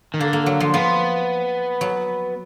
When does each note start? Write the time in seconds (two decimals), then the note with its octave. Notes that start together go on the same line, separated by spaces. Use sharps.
0.14 D#3
0.19 D3 A#3
0.33 A#3
0.46 F#3
0.60 F3
0.74 F3 B3
1.81 F#3